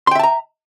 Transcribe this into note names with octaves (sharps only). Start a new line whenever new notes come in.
E5 G5 A5 A#5 C6